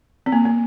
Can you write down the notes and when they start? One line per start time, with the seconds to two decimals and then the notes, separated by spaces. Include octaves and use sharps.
0.26 C4
0.32 A#3
0.45 A#3